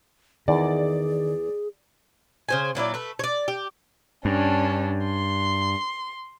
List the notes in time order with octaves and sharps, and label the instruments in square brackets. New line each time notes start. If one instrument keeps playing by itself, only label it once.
[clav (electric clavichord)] E2 [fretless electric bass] D#3 [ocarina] G#4 [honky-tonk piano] D5
[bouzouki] C#3 C5 G#5
A#2 F#3 E4 D5
A3 B4
C#5 D5
G4
[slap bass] G2 [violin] C#4 D4
[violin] C6